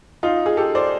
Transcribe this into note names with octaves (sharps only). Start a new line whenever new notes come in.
D#4 F4
G#4
G4 A4
C5 D5